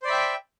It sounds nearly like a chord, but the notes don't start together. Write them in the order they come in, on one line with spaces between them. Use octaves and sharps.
C5 D5 B5 E5 G5